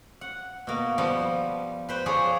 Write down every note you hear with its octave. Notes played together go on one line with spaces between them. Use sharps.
F#5
B2 A#3
F3 G3 B3
B4 C5 G5
F3 G#4 C#5 D5